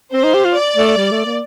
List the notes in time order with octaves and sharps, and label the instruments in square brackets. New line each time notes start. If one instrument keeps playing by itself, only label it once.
[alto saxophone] C4 [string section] C5
[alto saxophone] D#4
G4
F4
[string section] D5
[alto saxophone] A3
G3
A3
A#3